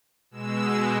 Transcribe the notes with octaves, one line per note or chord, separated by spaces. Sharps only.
B2 G#3 E6